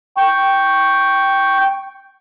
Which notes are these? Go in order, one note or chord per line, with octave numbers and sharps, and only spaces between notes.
G5 C#6